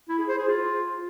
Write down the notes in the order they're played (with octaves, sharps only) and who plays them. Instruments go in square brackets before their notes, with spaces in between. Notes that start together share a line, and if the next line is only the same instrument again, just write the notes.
[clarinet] E4
G#4
C5
G#4
F4